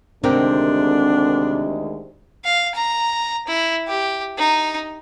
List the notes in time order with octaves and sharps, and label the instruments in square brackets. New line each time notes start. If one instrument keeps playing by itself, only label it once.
[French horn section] D2 D#3 G#3 [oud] C3 [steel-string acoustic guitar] C4 A#4 G5 [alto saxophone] D4
[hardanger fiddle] F5
A#5
E4
G4
D#4